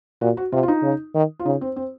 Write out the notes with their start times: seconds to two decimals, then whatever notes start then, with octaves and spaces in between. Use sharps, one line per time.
0.21 A#2 F#4
0.37 F#4
0.52 C3 F4
0.63 F4
0.68 D#4
0.83 C#3
1.14 D#3
1.39 F4
1.45 C#3 D#4
1.61 C4
1.76 C4